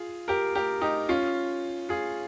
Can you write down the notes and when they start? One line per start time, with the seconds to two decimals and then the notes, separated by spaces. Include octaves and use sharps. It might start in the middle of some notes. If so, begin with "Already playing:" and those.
Already playing: F4 G#4
0.28 G4 A#4
0.55 G4 A#4
0.82 D#4 G4
1.09 C#4 F4
1.89 F4 G#4